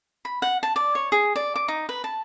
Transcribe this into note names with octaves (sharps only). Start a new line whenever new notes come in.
B5
F#5
A5
D5
C#5
G#4
D5
D6
D#4
B4
A5